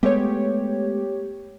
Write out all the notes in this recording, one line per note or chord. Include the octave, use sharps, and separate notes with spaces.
G#3 A3 B3 G4 C#5